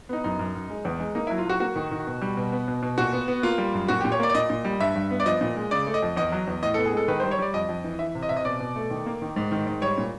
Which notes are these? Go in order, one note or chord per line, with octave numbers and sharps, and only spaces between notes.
B3 D#4
F#2 D#4
F#2
F#2
G#3
E2
G#3
A#3 D#4
F#3 E4
F4
F#3 F#4
A#3 F#4
D#3
D#3
B2
G3
B2
B3
B2
B2
A#2 F#4
B3
B3
A#3 F4
G3
F#2
A#2 F#4
A#2 G4
C#5
A#3 D5
D5
A#2 D#5
A#2
G3
G2 E5
G2
B3
D5
F3 D#5
A#2
G#3
C#3 D5
A3
D#5
F2
E2 D#5
F#3
E2
A2 D#5
B3 A4
G#4
G#3 A4
D#3 B4
G3 C5
C#5
G3 D5
F2 D#5
F2
E3
E3 E5
C3
D#5
C3 E5
D#5
B2 D5
B2
A3
D#3
A#3
D#3
G#2
D#3
G#2
G3 C#5
A#2